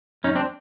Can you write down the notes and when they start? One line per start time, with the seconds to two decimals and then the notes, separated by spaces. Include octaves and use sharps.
0.24 F#2 C#4 D#4
0.35 C4 D4